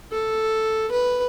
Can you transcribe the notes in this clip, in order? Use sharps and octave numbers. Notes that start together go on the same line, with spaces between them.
A4
B4